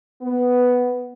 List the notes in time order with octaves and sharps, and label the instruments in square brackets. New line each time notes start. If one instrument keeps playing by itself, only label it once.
[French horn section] B3